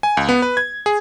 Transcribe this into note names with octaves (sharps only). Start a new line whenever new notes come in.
G#5
C#2
B3
B4
G#6
G#4